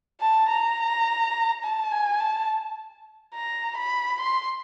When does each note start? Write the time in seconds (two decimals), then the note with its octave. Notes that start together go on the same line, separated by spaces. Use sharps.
0.21 A5
0.49 A#5
1.64 A5
1.92 G#5
2.20 A5
3.35 A#5
3.78 B5
4.21 C6